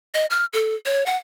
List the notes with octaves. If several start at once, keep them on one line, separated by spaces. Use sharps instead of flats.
D#5
F6
A4
C#5
F#5